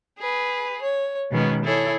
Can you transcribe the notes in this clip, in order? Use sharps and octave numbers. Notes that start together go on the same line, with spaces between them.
G#4 B4
C#5
B2 D#3 G#3 B3 C#4
E4 G#4 A4 C#5